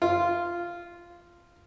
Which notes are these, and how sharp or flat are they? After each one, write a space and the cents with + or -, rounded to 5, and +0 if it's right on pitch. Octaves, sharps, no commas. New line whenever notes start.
F4 -10